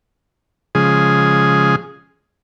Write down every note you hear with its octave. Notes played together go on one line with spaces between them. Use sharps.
C#3 F3 G#3 G#4